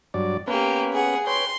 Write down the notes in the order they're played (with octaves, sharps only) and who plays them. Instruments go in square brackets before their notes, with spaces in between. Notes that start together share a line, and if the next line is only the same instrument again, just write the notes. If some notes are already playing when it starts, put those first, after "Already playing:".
[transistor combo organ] G2 F#3 D5
[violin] A#3 G4 [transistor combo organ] B3 C#4 B4
[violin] G#4 F#5
[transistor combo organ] B4 C#5 G5 [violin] C6